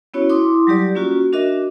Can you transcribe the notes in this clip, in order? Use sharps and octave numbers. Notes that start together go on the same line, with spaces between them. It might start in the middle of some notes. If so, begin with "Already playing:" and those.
B3 C#4 E4 F#4 C#5
E4 C6 D6 D#6
F#3 G3 G4 D5
A#3 C#4 F4 F#4
D4 F#4 A#4 D#5 E5